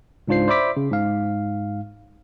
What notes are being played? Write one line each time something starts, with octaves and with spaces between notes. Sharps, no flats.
C#2 G#2 D4 F4 C5 C7
C5 D5 E5 B5 D6 B6
C#3
G#2 F5